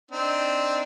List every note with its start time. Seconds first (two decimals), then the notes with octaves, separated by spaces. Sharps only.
0.11 C4 D4 D#4